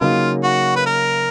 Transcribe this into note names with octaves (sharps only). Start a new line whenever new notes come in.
C#3 F#3 A#3 D#4 F4
F#4
B4
A#4